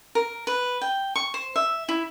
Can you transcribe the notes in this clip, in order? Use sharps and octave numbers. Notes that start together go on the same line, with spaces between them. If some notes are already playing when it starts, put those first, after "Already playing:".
A#4
B4
G5
C#6
C5
E5
E4